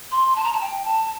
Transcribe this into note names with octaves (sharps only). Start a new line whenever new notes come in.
C6
A5
A#5
A5
G5
A5